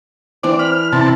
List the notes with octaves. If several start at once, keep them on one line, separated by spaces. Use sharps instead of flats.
E3 C4 D4 D5
B5 F6
C3 E4 A5